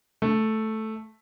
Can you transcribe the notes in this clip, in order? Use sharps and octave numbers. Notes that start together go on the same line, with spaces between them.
A3